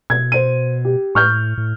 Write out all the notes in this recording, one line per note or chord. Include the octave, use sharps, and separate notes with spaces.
B2 G#6
C5 D#7
G4
A2 C#6 F6 G6
A2